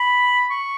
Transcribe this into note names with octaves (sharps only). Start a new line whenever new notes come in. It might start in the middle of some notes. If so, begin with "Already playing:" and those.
Already playing: B5
C#6